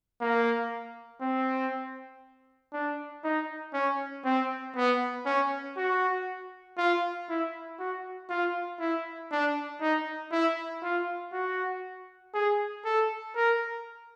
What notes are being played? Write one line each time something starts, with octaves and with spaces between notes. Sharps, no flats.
A#3
C4
D4
D#4
C#4
C4
B3
C#4
F#4
F4
E4
F#4
F4
E4
D4
D#4
E4
F4
F#4
G#4
A4
A#4